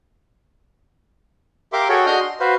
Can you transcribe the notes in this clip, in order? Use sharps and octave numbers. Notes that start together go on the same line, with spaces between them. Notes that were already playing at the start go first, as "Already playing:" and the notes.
G4 A#4 E5 F5 C6 D6
F#4 G#4 A4 C#5 G5
D4 F#4 D#5 D#6 F6 G6
C6
F#4 B4 C5 F5